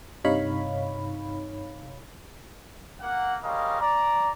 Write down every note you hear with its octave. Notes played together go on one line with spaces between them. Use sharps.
G2 C3 D#4 C#5 F5 B5
A#3 F#5
G3 G#3 C#4 A#4 D#5 F5
D5 A#5